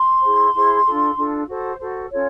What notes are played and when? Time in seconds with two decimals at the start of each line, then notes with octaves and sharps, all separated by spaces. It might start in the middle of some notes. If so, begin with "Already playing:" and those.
Already playing: C6
0.23 E4 G#4 C5
0.54 E4 G#4 C5
0.86 D4 F4 A4
1.17 D4 F4 A4
1.48 F#4 A4 C5
1.79 F#4 A4 C5
2.11 C#4 F4 A4 C#5